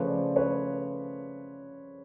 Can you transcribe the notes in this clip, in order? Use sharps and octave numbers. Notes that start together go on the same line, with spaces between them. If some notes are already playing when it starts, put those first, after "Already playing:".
Already playing: C#3 F3 A3 B4 C#5
C5 D5
B4 C#5